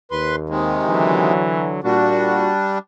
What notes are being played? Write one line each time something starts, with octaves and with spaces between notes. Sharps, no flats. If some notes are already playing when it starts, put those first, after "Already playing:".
D#2 B4 C6
C3 D#3 G#3
D3 E3 F#3
A#2 G3 D4 F#4